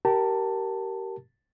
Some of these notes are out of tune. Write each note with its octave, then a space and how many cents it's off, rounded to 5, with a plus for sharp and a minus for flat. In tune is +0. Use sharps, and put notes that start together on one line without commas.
G4 -25 A#4 +0 A5 +15